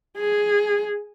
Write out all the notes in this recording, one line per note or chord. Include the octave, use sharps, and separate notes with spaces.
G#4